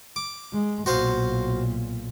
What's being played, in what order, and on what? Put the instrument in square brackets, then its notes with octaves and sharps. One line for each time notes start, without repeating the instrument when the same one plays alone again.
[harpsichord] D6
[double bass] G#3
[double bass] B1 A#2 [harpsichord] F#4 C5 F5